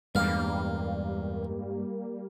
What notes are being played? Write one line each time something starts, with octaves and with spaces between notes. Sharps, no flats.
E2 G2 G3 G#3 A#3 F5